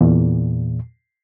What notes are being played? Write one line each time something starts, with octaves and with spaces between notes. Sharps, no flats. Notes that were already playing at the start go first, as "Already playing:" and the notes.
E2 A#2